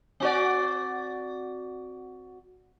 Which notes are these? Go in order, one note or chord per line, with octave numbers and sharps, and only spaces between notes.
C4 F#4 D5